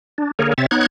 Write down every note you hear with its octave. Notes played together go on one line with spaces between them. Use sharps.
D4
D3 A#3 G#4 A#4 C#5
C3 C4 C#5 E5 A6
B3 D#4 C#5 F#6 G#6